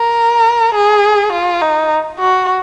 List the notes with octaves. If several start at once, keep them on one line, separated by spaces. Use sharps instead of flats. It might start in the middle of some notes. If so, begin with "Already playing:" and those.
Already playing: A#4
G#4
F4
D#4
F#4